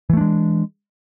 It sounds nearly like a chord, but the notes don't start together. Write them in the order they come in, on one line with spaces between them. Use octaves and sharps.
E3 A3 D4 G#3